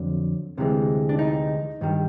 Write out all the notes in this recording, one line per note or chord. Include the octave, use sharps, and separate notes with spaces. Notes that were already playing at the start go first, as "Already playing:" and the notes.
Already playing: F2 D3 F#3
D2 C3 E3 G#3
D4
D#4
G2 D#3 G3